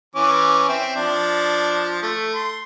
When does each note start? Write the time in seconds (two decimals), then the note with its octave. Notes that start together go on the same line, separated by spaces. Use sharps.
0.15 E3 C#4 D6
0.69 C4 E5
0.96 F3 D4
2.02 A3
2.34 C6